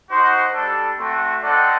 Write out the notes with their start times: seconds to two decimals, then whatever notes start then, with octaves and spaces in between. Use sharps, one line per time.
0.09 D#4 F#4 C5 F#5
0.54 G3 D4 A4
0.98 A3 C4 F#4
1.43 C4 D#4 A4 D5 F#5